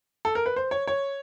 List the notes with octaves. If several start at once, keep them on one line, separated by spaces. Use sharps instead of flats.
A4
A#4
B4
C5
C#5
C#5